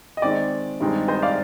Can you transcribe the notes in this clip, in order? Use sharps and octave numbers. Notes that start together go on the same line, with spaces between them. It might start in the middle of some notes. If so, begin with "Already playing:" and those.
D#5
D#3 G#3 C4 D5
G2 D#3 G#3 C4 D#4
C5 D#5
D5 F5